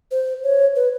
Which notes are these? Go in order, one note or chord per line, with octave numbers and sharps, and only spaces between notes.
C5
C#5
B4